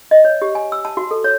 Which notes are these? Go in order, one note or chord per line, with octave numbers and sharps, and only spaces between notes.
D#5
C#5
G4
G#5
E6
A5
F#4
A4
C#5